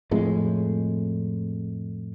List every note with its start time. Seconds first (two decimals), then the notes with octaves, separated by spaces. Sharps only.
0.11 F2 A2 G#3